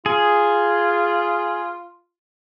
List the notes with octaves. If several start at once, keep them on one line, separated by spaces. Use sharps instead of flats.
F4 G#4